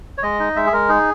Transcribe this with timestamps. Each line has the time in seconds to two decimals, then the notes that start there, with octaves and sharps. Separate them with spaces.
0.18 C#5
0.23 G#3 D#5
0.40 D#4
0.56 G#3 E5
0.66 G#4
0.73 G#3 A#4
0.89 D#4 G#4